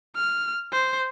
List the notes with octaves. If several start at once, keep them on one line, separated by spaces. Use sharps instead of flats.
F6
C5